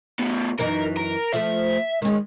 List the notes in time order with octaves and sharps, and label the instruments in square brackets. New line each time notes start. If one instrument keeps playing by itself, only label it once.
[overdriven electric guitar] A2 B3
[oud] F#2 E3 D#4 [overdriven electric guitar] A#4
[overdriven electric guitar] A#4
[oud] F3 A3 [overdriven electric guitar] E5
[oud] D#3 C#4 [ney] G#3